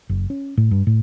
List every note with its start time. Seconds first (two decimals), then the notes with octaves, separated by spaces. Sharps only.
0.09 F#1
0.30 C#4
0.57 A2
0.71 G2
0.87 A2